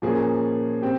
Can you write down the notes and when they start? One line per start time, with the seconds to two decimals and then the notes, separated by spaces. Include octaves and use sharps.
0.02 A#2 F3 A#3 C#4 G#4
0.82 C4 G4